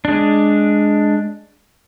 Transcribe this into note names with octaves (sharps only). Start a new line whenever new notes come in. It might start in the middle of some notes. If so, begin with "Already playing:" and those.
G#3 D4